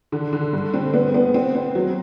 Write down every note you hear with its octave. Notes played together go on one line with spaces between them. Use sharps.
D3
D3
G2
C4
B3
B3
C4
C4
F#3